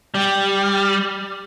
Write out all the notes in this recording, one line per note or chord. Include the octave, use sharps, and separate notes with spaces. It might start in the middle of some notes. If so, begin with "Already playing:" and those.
G3